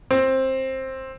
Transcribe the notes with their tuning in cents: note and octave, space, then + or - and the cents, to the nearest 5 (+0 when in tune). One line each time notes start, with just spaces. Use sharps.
C4 +15